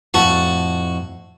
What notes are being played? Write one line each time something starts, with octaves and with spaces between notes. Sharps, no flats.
F2 A2 F#4 F#5 A5